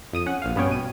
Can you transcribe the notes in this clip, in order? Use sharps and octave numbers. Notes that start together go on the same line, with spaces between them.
F2 D#6 D#7
C#4 F#5
A#1 F5
G2 B3 C#4 C#5 G5
B2 D#7